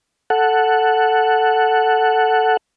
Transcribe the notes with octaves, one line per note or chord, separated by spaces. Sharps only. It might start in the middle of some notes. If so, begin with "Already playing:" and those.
A4 F#5